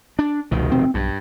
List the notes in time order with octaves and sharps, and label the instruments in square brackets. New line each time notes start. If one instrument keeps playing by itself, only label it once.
[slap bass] D4
[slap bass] F1 B2 D#3 [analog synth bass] C#2
[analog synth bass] C4
[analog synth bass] B1 [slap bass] G2